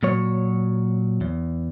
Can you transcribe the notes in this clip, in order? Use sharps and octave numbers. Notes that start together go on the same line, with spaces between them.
A#2 F#3 C#5
E2